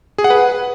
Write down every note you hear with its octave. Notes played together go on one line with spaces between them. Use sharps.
G#4
F#5
B4